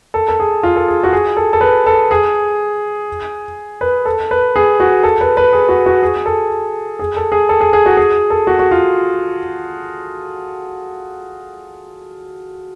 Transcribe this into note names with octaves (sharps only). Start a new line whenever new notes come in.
A4
A4
G#4
F4
A4
G#4
F#4
G#4
A4
A4
B4
A4
G#4
B4
A4
B4
G#4
F#4
A4
B4
B4
G#4
F#4
F#4
G#4
A4
G#4
A4
G#4
A4
G#4
G#4
F#4
G#4
A4
F#4
F#4
F4